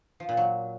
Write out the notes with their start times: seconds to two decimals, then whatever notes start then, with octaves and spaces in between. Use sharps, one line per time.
0.20 F3
0.29 A#2
0.37 F#3